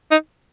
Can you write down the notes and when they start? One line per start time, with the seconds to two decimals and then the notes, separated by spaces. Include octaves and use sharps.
0.11 D#4